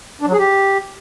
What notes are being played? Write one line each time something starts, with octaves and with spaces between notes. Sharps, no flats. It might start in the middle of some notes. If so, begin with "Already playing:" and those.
D4
F#3
G#4
G4